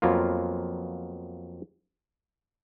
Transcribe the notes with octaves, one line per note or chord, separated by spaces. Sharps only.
F2 F#3 A#3 B3 F4